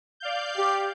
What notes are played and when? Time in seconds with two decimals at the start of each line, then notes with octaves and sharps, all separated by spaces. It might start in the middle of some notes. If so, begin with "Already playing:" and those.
0.20 D5 F5 G6
0.58 G4